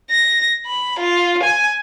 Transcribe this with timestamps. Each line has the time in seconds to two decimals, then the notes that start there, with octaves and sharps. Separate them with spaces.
0.11 A#6
0.67 B5
1.00 F4
1.44 G#5